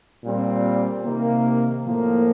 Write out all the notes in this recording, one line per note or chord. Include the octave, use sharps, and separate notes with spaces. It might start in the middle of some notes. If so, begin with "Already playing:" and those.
A#2 G3 C4
C3 D#3 A#3
A2 F3 A#3